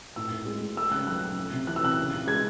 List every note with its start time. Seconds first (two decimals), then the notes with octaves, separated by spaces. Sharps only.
0.16 A2 E6
0.32 A2
0.46 G#3
0.61 G#3
0.77 A3 E6
0.91 C#3 F#6
1.07 F#3 F#6
1.22 C#3
1.37 A3
1.53 C3
1.67 E3 F#6
1.76 E6
1.83 C3 F#6
1.97 C#3
2.12 C#3
2.27 G#3 G#6